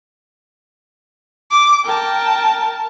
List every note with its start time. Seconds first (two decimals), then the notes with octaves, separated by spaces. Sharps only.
1.51 D6
1.85 A#4 G5 A5